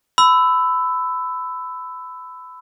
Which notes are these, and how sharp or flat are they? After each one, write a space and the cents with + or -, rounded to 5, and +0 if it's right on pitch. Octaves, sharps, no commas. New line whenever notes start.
B5 +25 E6 +0